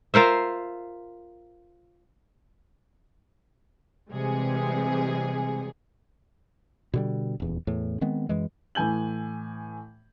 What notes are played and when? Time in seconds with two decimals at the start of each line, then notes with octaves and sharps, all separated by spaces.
0.14 F4 A#4 C5 E5
4.11 C3 E3 G3 G#3 G#4
6.94 B2 D3 G3
7.40 D#1 E2
7.67 E2 A2
8.01 D#3 G#3 B3 C4
8.29 F#2 E3 G#3
8.75 A2 E3 G#5 G6 F#7